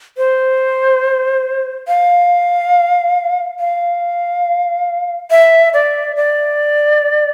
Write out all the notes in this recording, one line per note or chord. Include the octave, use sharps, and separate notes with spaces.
C5
F5
F5
E5
D5
D5